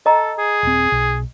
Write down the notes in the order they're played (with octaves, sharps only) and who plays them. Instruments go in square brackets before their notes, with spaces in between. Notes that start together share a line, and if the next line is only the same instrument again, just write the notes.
[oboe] A4 [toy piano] D#5 A#5
[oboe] G#4
[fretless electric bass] D#1 C4
B1